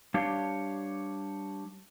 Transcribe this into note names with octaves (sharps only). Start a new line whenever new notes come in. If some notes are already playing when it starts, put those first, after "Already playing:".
G3 D4 G4 C#5 F5